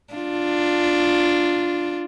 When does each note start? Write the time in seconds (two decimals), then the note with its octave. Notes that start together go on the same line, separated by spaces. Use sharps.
0.14 D4 F4